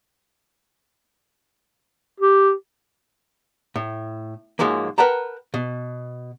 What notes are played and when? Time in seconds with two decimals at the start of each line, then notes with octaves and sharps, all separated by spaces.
2.20 G4
3.76 A2
4.59 G#2 F3 F#3 G#3 A#3
4.98 A#4 B4 F#5 G5 A5 A#5
5.54 B2